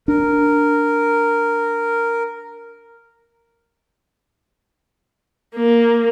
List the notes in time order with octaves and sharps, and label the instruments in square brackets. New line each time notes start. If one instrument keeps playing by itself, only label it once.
[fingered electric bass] D4 [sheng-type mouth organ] A#4
[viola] A#3